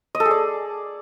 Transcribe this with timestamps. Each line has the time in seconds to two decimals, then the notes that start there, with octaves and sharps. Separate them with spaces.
0.15 D#5
0.20 A4
0.25 G#4
0.31 D5